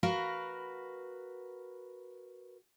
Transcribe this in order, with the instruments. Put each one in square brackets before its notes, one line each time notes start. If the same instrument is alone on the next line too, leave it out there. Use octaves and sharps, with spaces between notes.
[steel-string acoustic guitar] F#4 A#4 B4 F5